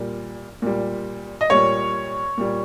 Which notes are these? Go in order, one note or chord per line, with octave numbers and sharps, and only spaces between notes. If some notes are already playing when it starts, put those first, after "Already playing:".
Already playing: A#2 G3
A#2 G3
D#5
A#2 G3 C#5
A#2 G3